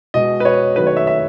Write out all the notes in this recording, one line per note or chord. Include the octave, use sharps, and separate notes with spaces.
B2 G#3 D#5
B4
C#5
D#3 F#3 A3 B4
C#5
E5
E5